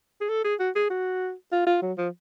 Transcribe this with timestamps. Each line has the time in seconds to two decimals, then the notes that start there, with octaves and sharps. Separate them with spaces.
0.21 G#4
0.29 A4
0.44 G#4
0.59 F#4
0.75 G#4
0.90 F#4
1.52 F4
1.66 F4
1.82 F#3
1.98 F3